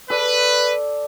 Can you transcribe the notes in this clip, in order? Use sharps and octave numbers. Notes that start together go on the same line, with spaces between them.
A4 B4 D5